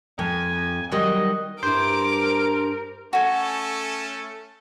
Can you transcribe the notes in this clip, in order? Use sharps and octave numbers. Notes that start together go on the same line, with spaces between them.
F2 G#5
D#3 F#3 G3 D#5
G2 E4 A#4 C5 D6 D7
A3 C#4 F#4 A4 G#5